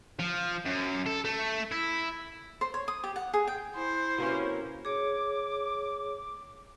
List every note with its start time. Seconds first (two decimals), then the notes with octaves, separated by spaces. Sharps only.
0.19 F3
0.66 F#2
1.06 A4
1.25 A3
1.72 E4
2.61 C5
2.74 C#5
2.88 D#6
3.04 G4
3.16 F#5
3.34 G#4
3.48 G5
3.76 E4 C5
4.18 C3 A#3 C#4 F#4 B4
4.85 G#4 C#5 D6